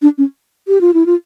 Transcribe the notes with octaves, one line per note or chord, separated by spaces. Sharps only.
D4
C#4
G4
F4
E4
F4